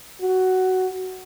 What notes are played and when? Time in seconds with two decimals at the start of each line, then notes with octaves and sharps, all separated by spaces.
0.22 F#4